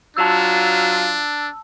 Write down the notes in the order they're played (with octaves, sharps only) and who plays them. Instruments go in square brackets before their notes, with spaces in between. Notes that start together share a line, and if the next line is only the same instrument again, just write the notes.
[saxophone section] F#3 F4 [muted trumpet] D4 [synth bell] A5 E6